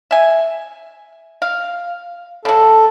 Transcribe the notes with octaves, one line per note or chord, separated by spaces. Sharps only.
E5 G#5
F5
C#3 F#3 A4